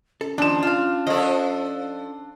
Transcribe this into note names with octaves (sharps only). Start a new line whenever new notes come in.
C#4 A4
D#2 F3 D4 E7
F4 F5
F3 A4 D5 D#5